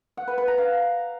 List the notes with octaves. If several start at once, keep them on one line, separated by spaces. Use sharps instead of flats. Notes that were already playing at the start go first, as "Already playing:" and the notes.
F#5
B4
B4
A#5
F5